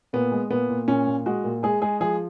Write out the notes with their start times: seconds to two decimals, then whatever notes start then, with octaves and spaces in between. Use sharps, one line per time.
0.13 A#2 B3
0.32 G#3
0.51 A#2 B3
0.69 A#2
0.88 A#2 C#4
1.07 A#2
1.26 G#3 F#4
1.44 A#2
1.63 G#3 G#4
1.82 G#3 G#4
2.00 F3 G#4